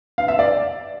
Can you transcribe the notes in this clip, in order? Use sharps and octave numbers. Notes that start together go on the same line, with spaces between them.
F5
E5
D5